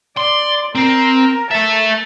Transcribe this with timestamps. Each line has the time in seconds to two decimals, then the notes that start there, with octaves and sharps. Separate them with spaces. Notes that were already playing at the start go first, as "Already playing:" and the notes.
0.17 D5 C6
0.75 C4 A#4
1.51 A4 E5 A5